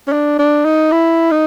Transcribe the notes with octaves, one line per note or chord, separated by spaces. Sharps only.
C#4
D4
D4
D#4
E4
D#4